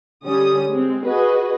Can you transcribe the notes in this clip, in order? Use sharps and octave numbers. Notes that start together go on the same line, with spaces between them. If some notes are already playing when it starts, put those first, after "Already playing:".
D3 G3 C#4 D#6
G#3 C4
F#4 G#4 B4 D#5